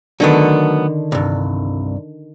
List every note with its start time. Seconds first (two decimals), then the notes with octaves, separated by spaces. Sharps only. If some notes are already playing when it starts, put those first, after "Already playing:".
0.20 D3 D#3 F#3 A3 B3
1.12 C2 G2